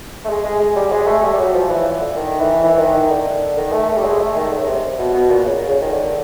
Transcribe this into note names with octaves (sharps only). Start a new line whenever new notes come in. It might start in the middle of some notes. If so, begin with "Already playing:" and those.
A3
G#3
G#3
G#3
G3
G#3
A3
G3
G3
F#3
F3
E3
D3
D#3
E3
E3
D#3
D#3
D3
D#3
A3
A3
G3
G#3
A3
D#3
D3
C#3
C3
B2
B2
A#2
C#3
C#3
D#3
D3